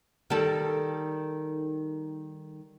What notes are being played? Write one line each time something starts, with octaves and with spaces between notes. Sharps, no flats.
D#3 G3 A4